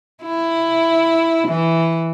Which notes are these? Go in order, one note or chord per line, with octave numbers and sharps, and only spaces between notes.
E4
E3